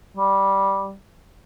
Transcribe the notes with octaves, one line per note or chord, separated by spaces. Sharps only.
G3